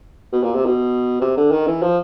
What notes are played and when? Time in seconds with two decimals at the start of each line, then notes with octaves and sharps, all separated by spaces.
0.32 B2
0.43 A#2
0.55 C3
0.66 B2
1.22 C3
1.37 D3
1.52 D#3
1.67 E3
1.82 F3